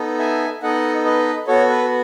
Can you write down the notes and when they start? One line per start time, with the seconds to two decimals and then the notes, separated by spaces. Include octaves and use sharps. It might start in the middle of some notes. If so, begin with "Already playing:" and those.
Already playing: B3 D#4 A4
0.19 E5 G#5
0.62 B3 D#4 A4 D#5 F#5
1.05 B4 D#5
1.48 B3 F#4 A4 C#5
1.70 B4